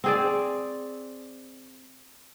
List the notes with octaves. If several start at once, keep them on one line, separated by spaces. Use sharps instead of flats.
C4 G#4 D5